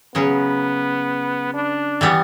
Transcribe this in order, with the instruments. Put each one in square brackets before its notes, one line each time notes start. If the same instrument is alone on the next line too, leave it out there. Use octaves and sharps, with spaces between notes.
[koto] C#3 F#3 C#4 [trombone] B3
[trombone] D4
[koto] E3 G3 B3